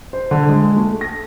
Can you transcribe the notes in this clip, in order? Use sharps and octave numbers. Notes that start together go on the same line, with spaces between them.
C5
D3
G#3
A3
A#6